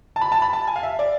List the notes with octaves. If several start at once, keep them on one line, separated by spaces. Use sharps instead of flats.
A5
B5
A5
B5
A5
G#5
F5
E5
D5